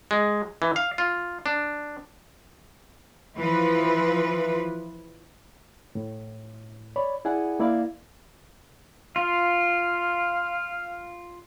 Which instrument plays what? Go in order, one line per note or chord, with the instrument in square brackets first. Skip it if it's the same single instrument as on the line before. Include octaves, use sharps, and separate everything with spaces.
[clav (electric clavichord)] G#3
E3
F5
F4
D4
[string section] E3 F3 B4
[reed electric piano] A2
C#5 D5 B5
E4 G#4 D5 F#5 G#5
A#3 E4 D5 F5
[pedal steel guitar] F4 [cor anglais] F5